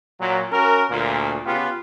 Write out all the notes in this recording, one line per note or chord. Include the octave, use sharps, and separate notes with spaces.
A#2 F#3
C#4 F#4 A#4
D2 A#2
C#3 B3 F4 G4